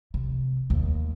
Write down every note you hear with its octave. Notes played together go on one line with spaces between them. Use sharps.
C3
D#2